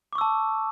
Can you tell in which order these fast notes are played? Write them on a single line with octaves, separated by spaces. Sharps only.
D6 C#6 E6 A5